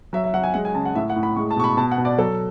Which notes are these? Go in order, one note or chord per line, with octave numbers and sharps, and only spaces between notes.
F#3 E5
E5
F#3 F#5
G#5
G#3 F#5
G#5
C#3 A5
F#5
A2 E5
F#5
A2
B5
G#3 C#6
A5
B2 C#6
B5
B2 A5
F#5
B2
D5
F#3 A4